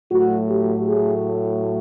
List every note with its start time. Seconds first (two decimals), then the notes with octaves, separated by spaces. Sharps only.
0.11 A2 F#3 A3 F#4
0.50 G4
0.88 G#4